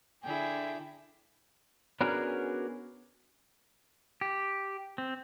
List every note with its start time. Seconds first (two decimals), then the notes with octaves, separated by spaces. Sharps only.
0.24 D3 E4 G#4 G5
2.01 B3 C#4 D4 F#4 G#4 A#4
4.21 G4
4.98 C4